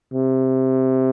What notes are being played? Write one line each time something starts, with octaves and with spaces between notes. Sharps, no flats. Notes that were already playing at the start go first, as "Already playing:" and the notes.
C3